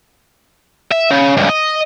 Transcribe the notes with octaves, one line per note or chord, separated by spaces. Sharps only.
E5
C#3
C#2 G2
D#5